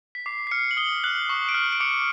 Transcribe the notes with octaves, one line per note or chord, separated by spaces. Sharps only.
B6
D6 C7
C7
F6 C#7
F#7
D#6 G7
F#6 F#7
C#6
D7
F6 C#7
D7
D6 C#7